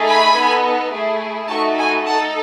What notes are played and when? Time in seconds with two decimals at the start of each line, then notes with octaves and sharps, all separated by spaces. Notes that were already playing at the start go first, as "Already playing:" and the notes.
Already playing: A3 D#4 G#4
0.08 G#5 B5
0.36 B3 D#4 A4
0.93 A3 E4 G#4
1.49 A3 D#4 F#4 A4 A5 C#6
1.78 G#5 B5
2.06 D#4 F#5 A5
2.10 A4